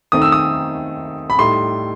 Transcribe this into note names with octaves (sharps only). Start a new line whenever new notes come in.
D#3 A3 C4 D#4 D#6
E6
D#6
B5
A2 G3 D#4 C6